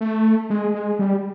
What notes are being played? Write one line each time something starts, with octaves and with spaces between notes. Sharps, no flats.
A3
G#3
G#3
G3